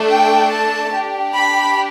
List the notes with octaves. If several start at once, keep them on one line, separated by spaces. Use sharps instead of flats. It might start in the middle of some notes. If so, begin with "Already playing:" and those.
Already playing: A3 D4 A4
G5
A5
D4 G4
B5